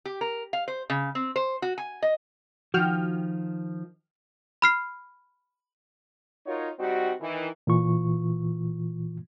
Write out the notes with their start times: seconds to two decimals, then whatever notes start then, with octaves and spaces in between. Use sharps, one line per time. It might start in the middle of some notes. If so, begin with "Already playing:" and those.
0.06 G4
0.21 A#4
0.53 F5
0.68 C5
0.90 C#3
1.15 C4
1.36 C5
1.62 F#4
1.78 G#5
2.03 D#5
2.74 D#3 F3 F#4 G5 F6
4.62 B5 F6 C7
6.46 D#4 F4 F#4 A#4 C#5
6.79 G3 C4 D#4 F#4
7.20 D#3 E3
7.67 A#2 E3 F4 C#6